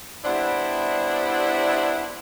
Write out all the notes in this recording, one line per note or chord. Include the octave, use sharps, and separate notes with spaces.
G3 B3 C4 D4 E4